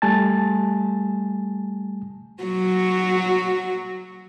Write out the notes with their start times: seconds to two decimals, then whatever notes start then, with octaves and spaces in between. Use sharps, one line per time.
0.02 G3 A3 G#5 A5 A6
2.43 F#3 F#4